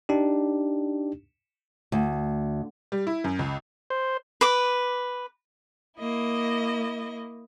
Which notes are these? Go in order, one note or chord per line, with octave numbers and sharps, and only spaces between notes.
D4 D#4 G4
D2
G3
E4
F#2
C#2
C5
B4 D6
A#3 E4 D#5